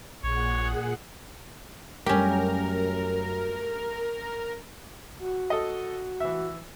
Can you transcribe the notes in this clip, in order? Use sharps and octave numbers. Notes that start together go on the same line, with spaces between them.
A#1 A#2 G#4 C#5 F#5
F#2 G3 A3 C#4 G4 A#4
F#4
A4 D#5
E3 E5